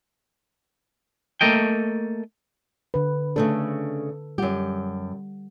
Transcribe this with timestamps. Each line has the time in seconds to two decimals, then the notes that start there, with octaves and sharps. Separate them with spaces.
1.41 A3 A#3 A4 D#5 G5
2.94 D3 B4
3.36 C#3 A3 D4 A4
4.38 F#2 G3 G4 F#5